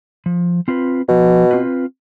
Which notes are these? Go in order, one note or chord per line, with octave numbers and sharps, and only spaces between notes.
F3
C4 F4 B4
B2 F3
C4 F4 B4